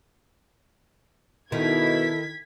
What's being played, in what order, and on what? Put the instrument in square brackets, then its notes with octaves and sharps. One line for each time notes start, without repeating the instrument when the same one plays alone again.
[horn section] B2 [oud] D#3 [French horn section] E4 A4 [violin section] G#6 B6